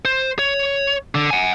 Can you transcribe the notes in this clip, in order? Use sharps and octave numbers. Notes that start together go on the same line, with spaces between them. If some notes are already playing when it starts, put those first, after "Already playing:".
C5
C#5
D3
F#5 G#5